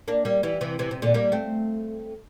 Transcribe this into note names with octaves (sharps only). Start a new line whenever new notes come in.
A#3 D4
G3 A#3
E3 G3
C3 E3
C3 E3
C3
A#2 D3
G3 A#3
A3 C4